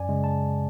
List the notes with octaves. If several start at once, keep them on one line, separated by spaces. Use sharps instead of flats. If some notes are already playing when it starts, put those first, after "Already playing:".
Already playing: F#2 D5 G#5
C#3 G#3
A5